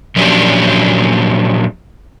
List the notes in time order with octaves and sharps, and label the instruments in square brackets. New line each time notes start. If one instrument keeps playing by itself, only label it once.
[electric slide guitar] A#2 F3 F#3 C#4 D4 G4